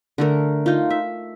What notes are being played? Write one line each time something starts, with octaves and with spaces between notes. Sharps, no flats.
D3 A3 A#4
D#4 F4
E5